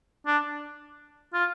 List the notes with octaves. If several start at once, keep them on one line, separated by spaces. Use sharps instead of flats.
D4
F4